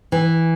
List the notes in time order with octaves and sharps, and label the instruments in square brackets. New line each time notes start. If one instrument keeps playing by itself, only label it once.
[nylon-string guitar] E3